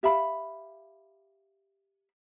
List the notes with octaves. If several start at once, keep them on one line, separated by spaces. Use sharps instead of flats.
G4 E5 F5 B5